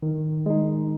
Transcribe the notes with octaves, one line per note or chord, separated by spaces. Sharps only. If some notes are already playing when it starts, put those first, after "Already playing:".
D#3
G#3 D#4